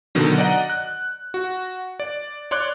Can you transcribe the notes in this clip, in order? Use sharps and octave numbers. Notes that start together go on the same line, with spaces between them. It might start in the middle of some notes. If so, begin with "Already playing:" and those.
B2 D3 D#3 F#3
D5 D#5 F#5 A#5
F#6
F#4
D5
C#5 D5 C6 D6 F#6